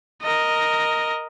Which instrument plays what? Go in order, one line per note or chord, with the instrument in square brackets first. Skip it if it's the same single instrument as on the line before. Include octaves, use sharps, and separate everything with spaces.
[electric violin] A#4 D#5